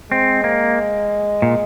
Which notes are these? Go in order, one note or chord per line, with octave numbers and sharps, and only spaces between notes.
G#3 C4
A#3
A#2